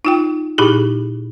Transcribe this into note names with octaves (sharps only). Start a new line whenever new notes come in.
D#4 F4 G5
A#2 D#4 E4 G4 G#4